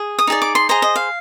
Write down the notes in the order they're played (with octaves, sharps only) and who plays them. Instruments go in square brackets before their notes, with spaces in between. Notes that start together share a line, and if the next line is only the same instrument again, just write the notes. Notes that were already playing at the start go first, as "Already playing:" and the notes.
Already playing: [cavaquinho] G#4
D#6
D#4 G#4 D5
D6
C6
G#4 C5 D#5 A#5
D#5
F5